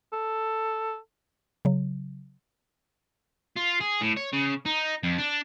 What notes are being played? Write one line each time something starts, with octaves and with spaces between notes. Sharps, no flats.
A4
C#3 F#3
F4
G#4
A2
C#5
C#3
D#4
F2
D4